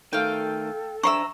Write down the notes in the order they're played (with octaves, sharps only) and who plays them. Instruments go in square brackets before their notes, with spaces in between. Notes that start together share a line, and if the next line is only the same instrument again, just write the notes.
[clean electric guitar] D#3 A3 [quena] A4 [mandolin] F5 G5
[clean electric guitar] D4 C5 E5 [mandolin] A#5 C6 E6 [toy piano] C#6